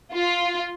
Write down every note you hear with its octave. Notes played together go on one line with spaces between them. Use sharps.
F4